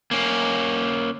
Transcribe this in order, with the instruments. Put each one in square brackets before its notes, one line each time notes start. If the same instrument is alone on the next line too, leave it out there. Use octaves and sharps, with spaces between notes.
[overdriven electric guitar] A#3 C#4